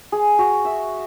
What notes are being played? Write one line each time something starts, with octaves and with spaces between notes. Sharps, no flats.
G#4
F#4
E5